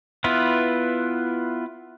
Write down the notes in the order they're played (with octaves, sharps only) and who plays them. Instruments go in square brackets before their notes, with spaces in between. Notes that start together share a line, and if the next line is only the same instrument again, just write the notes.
[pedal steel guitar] B3 E4 F4 B4